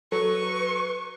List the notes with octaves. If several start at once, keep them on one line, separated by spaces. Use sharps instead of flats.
F#3 A4 B4 C#6